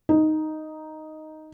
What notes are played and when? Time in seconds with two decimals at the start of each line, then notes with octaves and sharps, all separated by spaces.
0.09 D#4